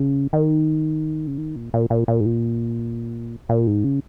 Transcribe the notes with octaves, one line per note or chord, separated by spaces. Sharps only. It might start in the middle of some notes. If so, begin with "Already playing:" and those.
Already playing: C#3
D#3
C#3
D#3
A#2
A#2
A#2
A#2
G#2
A#2
A#2
G#2
C#3